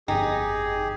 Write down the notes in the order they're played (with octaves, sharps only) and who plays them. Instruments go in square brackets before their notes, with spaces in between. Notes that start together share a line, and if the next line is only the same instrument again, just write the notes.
[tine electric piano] G1 F2 [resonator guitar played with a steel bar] D#4 [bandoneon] G4 G#4 [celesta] G5